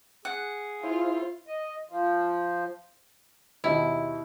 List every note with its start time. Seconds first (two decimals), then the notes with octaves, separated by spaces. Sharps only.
0.25 G#4 F#5
0.83 E4 F4 C5
1.47 D#5
1.89 F3
3.64 D#2 B2 E4 D#5